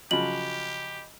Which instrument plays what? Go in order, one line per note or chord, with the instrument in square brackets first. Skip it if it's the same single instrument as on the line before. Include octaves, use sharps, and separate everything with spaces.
[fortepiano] C#3 F3 F#3 [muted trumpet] G4 [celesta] D#5 B5 [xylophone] F#7